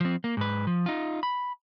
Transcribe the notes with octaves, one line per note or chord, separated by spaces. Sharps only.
F3 C4
A#3
G#2 B4
F3
D#4 F4
B5